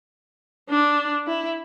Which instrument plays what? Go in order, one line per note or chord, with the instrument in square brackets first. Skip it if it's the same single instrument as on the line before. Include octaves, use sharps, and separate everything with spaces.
[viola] D4
E4